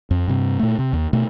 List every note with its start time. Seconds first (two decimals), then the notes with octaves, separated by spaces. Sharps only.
0.11 F2
0.28 G2 C3
0.59 A#2 A3
0.79 C3
0.93 D#2
1.13 B2 A3